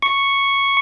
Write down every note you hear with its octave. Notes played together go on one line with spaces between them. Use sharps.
C#6